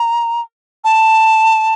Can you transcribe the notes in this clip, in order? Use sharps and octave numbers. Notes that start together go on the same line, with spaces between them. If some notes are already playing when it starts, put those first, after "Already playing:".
Already playing: A#5
A5